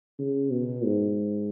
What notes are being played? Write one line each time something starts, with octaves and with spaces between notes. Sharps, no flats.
C#3
B2
G#2